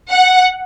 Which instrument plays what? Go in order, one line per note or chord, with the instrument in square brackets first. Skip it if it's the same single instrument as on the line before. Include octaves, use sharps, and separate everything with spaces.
[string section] F#5